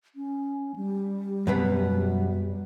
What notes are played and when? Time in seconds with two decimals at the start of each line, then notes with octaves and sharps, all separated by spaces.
0.16 C#4
0.76 G3
1.47 F#2 B2 B3